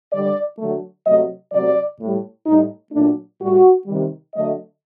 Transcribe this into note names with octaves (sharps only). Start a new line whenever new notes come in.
D3 G3 D5
D3 F#3 A3
C3 F#3 A3 D#5
C3 F#3 A3 D5
A2 G3
A2 G3 D#4
A#2 F#3 A3 D4
A2 G3 F#4
C3 D#3 G3
D3 F#3 A3 D#5